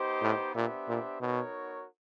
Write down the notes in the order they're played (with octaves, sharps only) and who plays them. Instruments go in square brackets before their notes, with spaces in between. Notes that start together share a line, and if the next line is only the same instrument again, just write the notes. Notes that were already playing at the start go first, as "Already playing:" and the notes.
Already playing: [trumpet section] B3 D#4 G4 C5 D#5
[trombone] A2
[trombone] A#2 [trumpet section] B3 D4 G4 C5 E5
[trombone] A#2
[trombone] B2 [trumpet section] B3 D#4 F#4 A#4 C#5